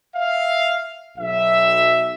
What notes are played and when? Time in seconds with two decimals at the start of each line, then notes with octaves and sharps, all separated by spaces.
0.16 E5 F5
1.18 B1 E5